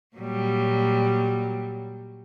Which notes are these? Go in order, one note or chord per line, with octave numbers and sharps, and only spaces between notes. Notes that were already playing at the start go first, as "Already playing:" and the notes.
A#2 F#3 G3